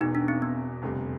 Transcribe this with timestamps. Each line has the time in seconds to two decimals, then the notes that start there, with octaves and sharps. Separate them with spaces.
0.01 E1 E2 B2 D#4
0.15 D4
0.28 C4
0.42 B3
0.82 F1 F2 D3 G3